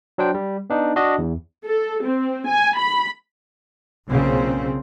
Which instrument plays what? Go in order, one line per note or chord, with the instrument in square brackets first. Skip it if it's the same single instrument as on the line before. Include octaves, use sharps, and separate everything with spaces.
[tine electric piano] F#3 D4 C5 G5
G3
B3 D4 D#4
D4 F#4 D#5
E2
[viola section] A4
C4
G#5
B5
[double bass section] B1 A#2 C#3 C4